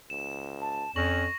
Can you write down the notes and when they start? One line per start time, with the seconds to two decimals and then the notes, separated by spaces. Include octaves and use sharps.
0.10 C#2 E7
0.61 A5
0.96 F2 C#4 C#6 A#6 F#7